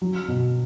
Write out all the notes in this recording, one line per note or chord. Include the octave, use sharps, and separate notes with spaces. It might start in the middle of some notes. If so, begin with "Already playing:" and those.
F#3
B2